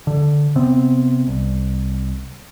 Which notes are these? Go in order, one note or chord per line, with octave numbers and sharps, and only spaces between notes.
D3
C3 B3 C4
C2